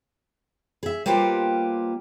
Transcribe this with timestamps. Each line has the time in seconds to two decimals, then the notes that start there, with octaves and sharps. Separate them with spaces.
0.83 G#4 E5
1.06 G3 A#3 F4 G4 B4 C5